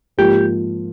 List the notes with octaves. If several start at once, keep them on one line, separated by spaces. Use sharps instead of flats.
G#2 F3 A#3 F4 G4